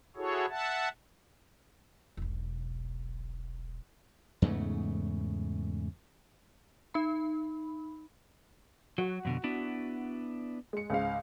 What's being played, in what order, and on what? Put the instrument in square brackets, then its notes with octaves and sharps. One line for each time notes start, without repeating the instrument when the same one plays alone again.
[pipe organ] E4 F#4 G#4 A4 C#5
E5 F#5 A5
[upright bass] E1 B1
[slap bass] E2 G#2 C#3 A3
[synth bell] D#4 B5
[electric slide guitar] F#3 [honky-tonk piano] F#4
[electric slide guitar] F2 B2 D3
B3 D4 E4
[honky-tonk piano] G#3 C#7
C#2 G#2 F5